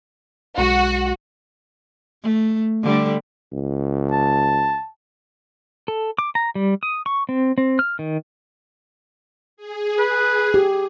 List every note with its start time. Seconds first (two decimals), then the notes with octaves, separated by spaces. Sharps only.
0.58 B1 G#3 F#4 C#7
2.23 A3
2.83 D3 G3 A3
3.52 C#2
4.12 A5
5.88 A4
6.19 D6
6.35 A#5
6.55 G3
6.83 D#6
7.06 C#6
7.29 C4
7.58 C4
7.79 F6
7.99 D#3
9.57 G#4
9.99 B4
10.54 G4